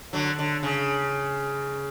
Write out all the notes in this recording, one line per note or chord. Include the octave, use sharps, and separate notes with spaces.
D3 F#3
D3
C#3